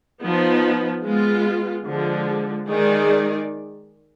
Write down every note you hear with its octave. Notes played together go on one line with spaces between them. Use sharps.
F3 B3 D#4
G#3 B3 F4
D3 F3 G#3
D#3 G#3 D#4 G#4 D5